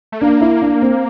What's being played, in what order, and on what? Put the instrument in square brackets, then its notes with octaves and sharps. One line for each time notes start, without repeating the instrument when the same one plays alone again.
[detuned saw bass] A3
[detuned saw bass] A#3 [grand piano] D4
[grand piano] E4
D4
C4